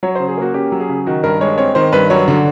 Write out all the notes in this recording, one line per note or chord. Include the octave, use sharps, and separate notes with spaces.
F#3 C#5
C5
C#3
G#4
A#3 F#4
C#4 G4
F#3
G#4
C#3
D#3 F#4
G2 A#4
G#3 C#5
C4 C#5
D#3 C5
G2 B4
F#3 C#5
D3